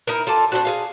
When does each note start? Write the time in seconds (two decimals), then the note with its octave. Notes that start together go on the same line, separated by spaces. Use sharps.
0.07 D#4 E4 A#4
0.27 F4 A4 D5 A5
0.52 C4 D4 F#4
0.65 G#4 A4 F5